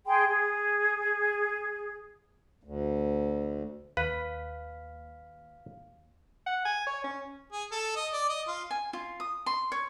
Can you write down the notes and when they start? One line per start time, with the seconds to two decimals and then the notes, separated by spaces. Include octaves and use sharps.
0.07 G#4 G5 G#5 C6
0.29 G#4
2.63 D2
3.97 D#2 B4 F5
6.47 F#5
6.65 G#5
6.87 C#5
7.04 C#4
7.52 G#4
7.72 A4
7.96 D#5
8.13 D5
8.29 D#5
8.48 F4
8.71 G#5
8.93 F4
9.20 D#6
9.46 C6
9.72 C#5